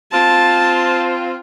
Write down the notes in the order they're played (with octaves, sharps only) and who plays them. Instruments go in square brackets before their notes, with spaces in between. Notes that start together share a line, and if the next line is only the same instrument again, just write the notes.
[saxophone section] C4 F4 [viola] A5